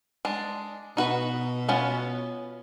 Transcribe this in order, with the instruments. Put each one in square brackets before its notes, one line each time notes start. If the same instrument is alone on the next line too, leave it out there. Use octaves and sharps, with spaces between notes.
[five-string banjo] G#3 D4
[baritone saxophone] B2 [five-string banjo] D#4 F#4 B4
[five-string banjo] B3 C#4 F4